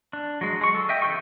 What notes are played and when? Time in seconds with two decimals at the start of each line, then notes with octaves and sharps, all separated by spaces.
0.13 D4
0.41 F#3 G#3
0.61 G#3 C#6
0.74 A4
0.89 D#5 E5 G5
1.02 C#3 E3 B3 G4 C#6